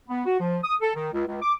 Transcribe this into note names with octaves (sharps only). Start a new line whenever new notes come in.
B3
F#4
F3
D#6
A4
D#3
C#2
C#2
D6